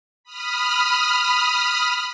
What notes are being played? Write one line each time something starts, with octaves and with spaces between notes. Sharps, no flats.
B5 D#6 F6